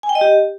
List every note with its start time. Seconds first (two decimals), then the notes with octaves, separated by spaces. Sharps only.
0.03 G#5
0.09 G5
0.15 D#5
0.21 G4